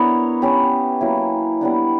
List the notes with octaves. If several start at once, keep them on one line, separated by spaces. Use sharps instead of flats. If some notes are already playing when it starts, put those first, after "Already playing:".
Already playing: B3 D4 E4 A#4 C#5
C#4 G4 B4
F#3 A#3 E4
G3 B3 D4